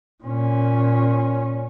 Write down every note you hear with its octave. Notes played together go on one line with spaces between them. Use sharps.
A#2 C#4